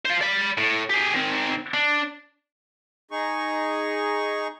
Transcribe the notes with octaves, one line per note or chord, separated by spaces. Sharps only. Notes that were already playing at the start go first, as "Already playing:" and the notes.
C5 F5
D5 B5
A2
G4 G#4
D#3 C4
D4
D#4 G#4 C#6